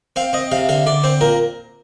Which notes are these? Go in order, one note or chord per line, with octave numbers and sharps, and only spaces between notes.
C4 F5
C4 D#5
C3 F5
D3 F5
D3 D5
C4 C5
A#2 A#4